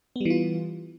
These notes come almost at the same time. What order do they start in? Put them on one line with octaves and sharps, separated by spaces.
B3 G3 E3 F4